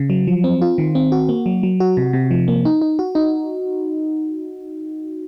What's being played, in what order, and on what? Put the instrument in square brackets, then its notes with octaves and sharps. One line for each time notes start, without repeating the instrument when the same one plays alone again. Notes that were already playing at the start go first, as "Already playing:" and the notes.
Already playing: [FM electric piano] C#3
F#3
F3
C4
F4
D#3
C4
F#4
A#3
F#3
F#3
F#4
C3
C3
F3
A#3
D#4
D#4
F#4
D#4